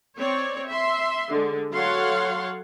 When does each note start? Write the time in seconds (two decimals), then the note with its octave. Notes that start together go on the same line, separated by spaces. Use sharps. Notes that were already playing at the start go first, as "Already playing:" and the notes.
0.18 C4 C#5 D5
0.67 E5 C6
1.30 D3 G#3
1.73 F#3 A4 C#5 F5 F#5 C6